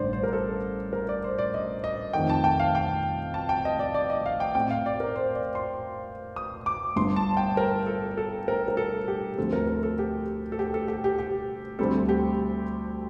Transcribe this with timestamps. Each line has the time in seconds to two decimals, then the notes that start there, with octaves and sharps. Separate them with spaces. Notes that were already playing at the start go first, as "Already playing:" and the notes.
Already playing: A1 G2 D3 C5 D5
0.13 C5
0.23 A#4
0.33 A4
0.93 A#4
1.09 D5
1.24 C5
1.39 D5
1.54 D#5
1.84 D#5
2.13 F2 D#3 A3 G5
2.29 A5
2.44 G5
2.60 F5
2.75 G5
3.34 A5
3.49 G5
3.65 D#5
3.79 D5
3.94 D5
4.10 D#5
4.26 F5
4.40 G5
4.55 A2 A3 C4 G5
4.71 F5
4.86 D5
5.00 A#4
5.16 C5
5.35 D5
5.55 C6
6.36 D#6
6.66 D6
6.96 G1 G2 D3 C6
7.16 A5
7.37 G5
7.57 A#4
7.86 A4
8.17 A4
8.48 A#4
8.68 A#4
8.77 A4
9.08 G4
9.37 D2 D3 F3 C4 A4
9.53 A#4
9.67 A#4
9.83 A4
9.99 G4
10.52 A4
10.59 G4
10.74 A4
10.88 G4
11.04 G4
11.19 G4
11.79 D2 D3 G3 C4 A4
12.09 G4